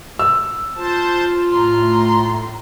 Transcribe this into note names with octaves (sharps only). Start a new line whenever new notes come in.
E6
F4 C5 A5
A2 A#5 C6